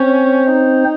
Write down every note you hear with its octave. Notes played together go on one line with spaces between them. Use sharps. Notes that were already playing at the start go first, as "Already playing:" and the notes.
Already playing: C4 C#4 C5
D#4